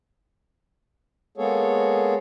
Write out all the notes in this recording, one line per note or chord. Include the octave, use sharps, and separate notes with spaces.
G#3 A#3 B3 G#4 A4 C#5